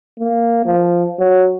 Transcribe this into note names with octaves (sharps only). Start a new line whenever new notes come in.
A#3
F3
F#3